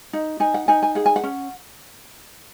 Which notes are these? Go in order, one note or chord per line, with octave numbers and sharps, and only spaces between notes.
D#4
D#4 G#5
F#5
D#4 G#5
G#5
G#4 F#5
G#5
F#5
C#4